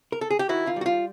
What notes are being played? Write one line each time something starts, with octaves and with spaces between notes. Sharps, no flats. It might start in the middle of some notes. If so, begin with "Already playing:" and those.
A#4
A4
G#4
G4
D#3 E4 F#4
F4
G3 F#4
F4